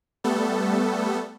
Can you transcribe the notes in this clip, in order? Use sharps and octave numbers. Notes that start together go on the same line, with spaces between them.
G3 A3 B3 A4